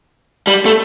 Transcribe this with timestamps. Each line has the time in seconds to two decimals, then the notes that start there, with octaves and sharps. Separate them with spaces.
0.47 G3
0.66 A3